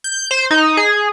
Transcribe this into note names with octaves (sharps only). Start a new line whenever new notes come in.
G6
C5
D#4
G#4